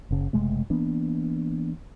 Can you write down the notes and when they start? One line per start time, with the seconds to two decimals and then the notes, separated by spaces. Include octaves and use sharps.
0.11 F#1 C#3
0.33 F#1 C3 G#3 A3
0.70 E3 A#3 B3 D4